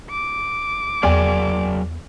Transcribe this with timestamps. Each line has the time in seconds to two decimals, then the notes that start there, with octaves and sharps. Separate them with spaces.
0.10 D6
1.03 E2 F#3 G#4 A#4 D5 G5 G#5